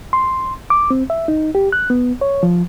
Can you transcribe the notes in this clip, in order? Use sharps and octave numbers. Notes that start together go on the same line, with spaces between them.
C6
D6
C4
E5
D#4
G4
F#6
B3
C#5
F3